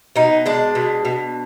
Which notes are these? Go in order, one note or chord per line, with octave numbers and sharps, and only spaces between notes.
B2 D#4
G#3 D4
B2
B2